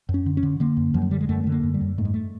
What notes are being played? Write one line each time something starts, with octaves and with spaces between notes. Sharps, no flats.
F#2
C#4
D3
C#4
D3
D3 A#3
F#2
F#2 F3
F#3
D3 G3
G#3
F#2 A3
A3
D3
A#3
F#2
G3
F#2
G#2 A3
G#3
A3